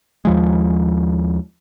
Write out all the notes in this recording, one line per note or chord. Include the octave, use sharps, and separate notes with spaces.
D#2 F3 G#3